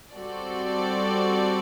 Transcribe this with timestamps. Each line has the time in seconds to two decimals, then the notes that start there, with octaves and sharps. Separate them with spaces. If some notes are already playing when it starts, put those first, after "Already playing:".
0.14 G3 C4 F#4 A4 D5